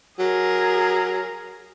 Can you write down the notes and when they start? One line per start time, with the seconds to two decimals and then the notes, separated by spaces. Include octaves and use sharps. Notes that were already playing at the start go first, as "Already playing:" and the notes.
0.19 F#3 G#4 A#4